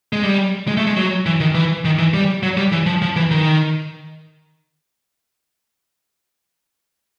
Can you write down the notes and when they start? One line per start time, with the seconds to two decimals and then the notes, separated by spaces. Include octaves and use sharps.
0.13 G#3
0.24 G3
0.68 G#3
0.77 A3
0.87 G#3
0.96 F#3
1.26 E3
1.40 D#3
1.55 E3
1.85 D#3
1.99 E3
2.14 G3
2.43 F#3
2.57 G3
2.72 E3
2.86 F3
3.02 F3
3.16 E3
3.31 D#3